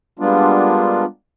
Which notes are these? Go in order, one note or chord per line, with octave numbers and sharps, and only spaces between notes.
G3 G#3 A#3 B3 D4 F4